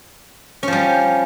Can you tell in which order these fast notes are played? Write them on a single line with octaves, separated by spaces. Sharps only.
C#4 F3 G3